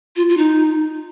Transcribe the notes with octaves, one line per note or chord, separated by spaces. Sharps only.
F4
F4
D#4